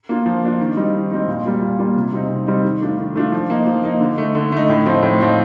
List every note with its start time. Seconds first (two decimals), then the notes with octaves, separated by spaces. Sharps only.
0.09 A#3 D4 F4
0.26 F3
0.43 A#3 D4 F4
0.60 D#3
0.77 G3 C4 D#4
0.95 D#3
1.11 G3 C4 D#4
1.28 A#2
1.45 G3 A#3 F4
1.62 A#2
1.79 G3 A#3 F4
1.96 C3
2.13 G3 C4 D#4
2.30 C3
2.47 G3 C4 D#4
2.64 D#3
2.81 A3 D4 F4
2.99 D#3
3.16 A3 D4 F4
3.32 F3
3.50 A#3 D#4
3.66 F3
3.83 A#3 D#4
4.00 D3
4.18 A3 D#4
4.35 D3
4.52 A3 D#4
4.69 A2
4.86 F3 C4 D#4
5.03 A2
5.20 F3 C4 D#4